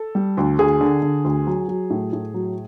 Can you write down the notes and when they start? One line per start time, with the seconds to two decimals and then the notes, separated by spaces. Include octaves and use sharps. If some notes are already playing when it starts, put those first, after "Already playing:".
Already playing: A4
0.15 G3
0.37 D2
0.59 D2 G#4
0.81 D3
1.02 D3
1.25 D2
1.47 F#3
1.68 F#3
1.90 A2
2.13 A2
2.34 F#3